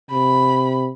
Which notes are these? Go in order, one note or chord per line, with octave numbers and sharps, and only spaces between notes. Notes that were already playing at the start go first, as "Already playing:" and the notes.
C3 B5